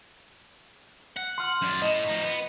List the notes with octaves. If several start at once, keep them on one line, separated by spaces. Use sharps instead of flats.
F#5
C6 F6
F#2 D5
A2 D#5
F3 D#4
B3